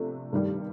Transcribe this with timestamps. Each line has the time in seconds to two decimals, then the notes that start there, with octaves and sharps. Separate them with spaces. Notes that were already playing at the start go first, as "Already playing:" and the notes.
Already playing: C3 F3 A3 D4
0.33 G2 D#3 G3